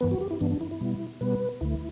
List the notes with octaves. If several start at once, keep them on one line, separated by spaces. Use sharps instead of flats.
G2 E3 B3 B4
F#4
G4
E4
G2 E3 B3 D4
D4
E4
E4
B2 G3 B3
B2 G3 B3 B4
D2 D3 A3 E4